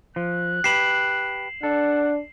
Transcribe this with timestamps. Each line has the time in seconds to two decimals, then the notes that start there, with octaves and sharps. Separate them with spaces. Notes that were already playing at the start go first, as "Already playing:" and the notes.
0.16 F3 F#6
0.64 G4 B4 C7 E7 F#7
1.63 D4 A4 F#5